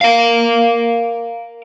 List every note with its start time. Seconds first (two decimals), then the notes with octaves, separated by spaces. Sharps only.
0.01 A#4 F5